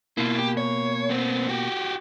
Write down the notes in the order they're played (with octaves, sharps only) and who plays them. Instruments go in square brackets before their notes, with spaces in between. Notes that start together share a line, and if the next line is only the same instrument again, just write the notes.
[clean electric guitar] B2 A#3 [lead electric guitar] E4 F4
[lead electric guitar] G4
C#5
B3 C4
F#4 G4